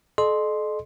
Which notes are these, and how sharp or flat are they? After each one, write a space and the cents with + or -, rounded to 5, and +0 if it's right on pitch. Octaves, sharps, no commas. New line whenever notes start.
A4 -40 D#5 -35 C6 +0